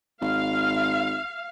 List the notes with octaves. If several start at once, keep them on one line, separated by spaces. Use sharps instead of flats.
G#1 F5